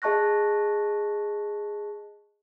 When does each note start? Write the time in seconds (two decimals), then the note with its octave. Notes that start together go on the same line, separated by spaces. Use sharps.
0.02 G#4 D#5 A5 C#6 F#6 A#6